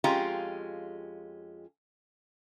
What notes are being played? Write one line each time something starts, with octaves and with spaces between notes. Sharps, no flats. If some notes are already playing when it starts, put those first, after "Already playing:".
F2 G#3 C#4 F4 G4 A#5